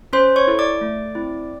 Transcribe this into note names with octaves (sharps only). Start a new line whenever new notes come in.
C#4 C5 C6
C#5 C#6
E4 A4
D5 D6
A3
C4 E4